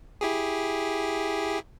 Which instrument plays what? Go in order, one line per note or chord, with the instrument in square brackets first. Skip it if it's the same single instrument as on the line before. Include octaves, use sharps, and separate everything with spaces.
[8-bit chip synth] E4 G4 G#4